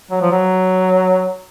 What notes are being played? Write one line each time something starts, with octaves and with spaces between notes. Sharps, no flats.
F#3
F3
F#3